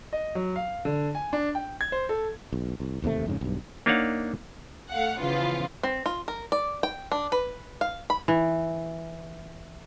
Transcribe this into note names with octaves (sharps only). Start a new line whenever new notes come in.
D#5
F#3
F5
D3
G#5
D4
G5
G#6
C5
A4
B1
C2
E1 D#2 C3 A3
F2 G#2 C#3
B1 G2
A#3 D4 D#4 C#5 F5 F#5
A3 F5 F#5
C#3 E3 F3 B3 F4
C4
F4
A#4
D5
G5
D4
B4
F5
B5
E3